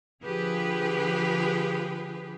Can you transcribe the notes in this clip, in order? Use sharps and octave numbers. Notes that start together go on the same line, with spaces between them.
D3 F3 G4 G#4 B4